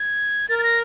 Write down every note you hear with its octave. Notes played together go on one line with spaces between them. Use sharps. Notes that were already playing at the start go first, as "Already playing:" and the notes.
Already playing: G#6
A#4 A6
A6
A#6